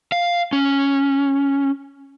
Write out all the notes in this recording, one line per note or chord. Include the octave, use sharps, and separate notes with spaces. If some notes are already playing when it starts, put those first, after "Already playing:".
F5
C#4